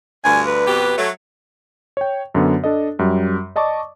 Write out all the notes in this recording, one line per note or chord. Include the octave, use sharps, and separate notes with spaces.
D2 G2 G#5
B4
F2 B2 G4
F#3 A3
C#5 G5
F#2 D3 B3
D4 A4 D#5
F#2 G3
D5 D#5 A5 C#6 D6